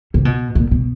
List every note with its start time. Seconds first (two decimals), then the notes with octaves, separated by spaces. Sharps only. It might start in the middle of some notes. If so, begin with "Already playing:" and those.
0.14 C3
0.25 B2
0.55 A#2
0.71 B2